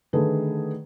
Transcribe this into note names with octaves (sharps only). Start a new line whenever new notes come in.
D3 D#3 A3 G#4 A4 B4